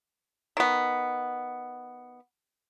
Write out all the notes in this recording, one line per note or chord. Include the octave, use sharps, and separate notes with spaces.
D#3 B3